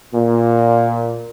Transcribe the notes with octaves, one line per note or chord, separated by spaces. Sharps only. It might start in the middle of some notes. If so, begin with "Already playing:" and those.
A#2